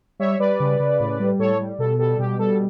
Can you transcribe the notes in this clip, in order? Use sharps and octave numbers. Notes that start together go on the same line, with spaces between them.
G3 C#5 E5
G3 B4 D5
C#3
C#3
A2
G3
A2 A4 C#5
G3
B2 A4
G3 A4
B2 G4
G3 A4